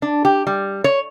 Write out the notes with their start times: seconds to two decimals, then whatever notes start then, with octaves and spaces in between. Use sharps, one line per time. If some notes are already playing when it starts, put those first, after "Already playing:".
0.02 D4
0.25 G4
0.47 G3
0.84 C#5